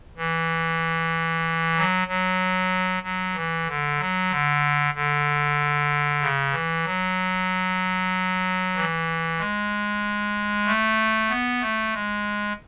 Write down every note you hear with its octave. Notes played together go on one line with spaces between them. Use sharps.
E3
F#3
F#3
F#3
E3
D3
F#3
D3
D3
C#3
E3
F#3
E3
G#3
A3
B3
A3
G#3